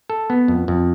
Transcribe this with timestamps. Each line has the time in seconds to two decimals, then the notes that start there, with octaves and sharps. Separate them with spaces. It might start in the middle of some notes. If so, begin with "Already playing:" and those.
0.10 A4
0.30 B3
0.48 F2
0.68 F2